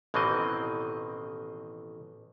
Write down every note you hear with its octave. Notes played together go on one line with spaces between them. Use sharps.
A1 B2 D#3 E3 C4 D#5